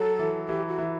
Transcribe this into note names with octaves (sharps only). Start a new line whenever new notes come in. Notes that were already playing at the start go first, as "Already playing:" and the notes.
Already playing: F#3 A4
E3
E3 G4
F#4
E3